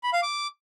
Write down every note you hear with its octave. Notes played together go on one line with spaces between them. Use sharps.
B5
F5
D6